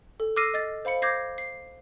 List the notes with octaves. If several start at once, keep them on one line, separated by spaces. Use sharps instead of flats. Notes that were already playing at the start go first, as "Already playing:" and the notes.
A4
D6 E6 F6 A#6 C7 D#7
D#5 A6
C5 F5 B5 C#7
D6 G6 G#6 A#6 C7
C7